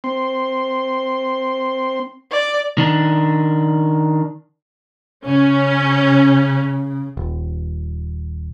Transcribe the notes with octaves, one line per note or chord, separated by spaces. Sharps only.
C4 C6
D5
D#3 D4
C#3 C#4
D#1